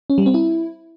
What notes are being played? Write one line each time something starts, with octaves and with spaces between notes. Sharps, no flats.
C#4
G3
C4
E4